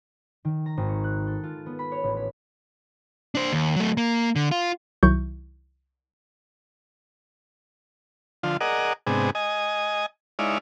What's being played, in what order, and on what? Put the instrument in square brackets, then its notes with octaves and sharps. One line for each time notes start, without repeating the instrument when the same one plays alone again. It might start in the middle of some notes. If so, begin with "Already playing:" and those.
[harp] D#3
A#5
G#1
C#6
F#6
A4
F4
B3
B5
C#5
A1
B5
[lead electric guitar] D4 C5
D#2
F#3 A3
A#3
D3
F4
[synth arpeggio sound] C2 D#3 F#3 E4 C#6 G6
[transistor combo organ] D3 F3 F4
G#4 A#4 D5 D#5 F#5
G#2 C3 B3 D4 G#4
D#5 G#5
G#3 D#4 E4 C#5 D5 F5